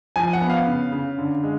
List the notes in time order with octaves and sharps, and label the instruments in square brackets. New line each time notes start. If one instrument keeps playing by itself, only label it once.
[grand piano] F3 G#5
F#5
B3
F5
C#3
C#3
D3
G#3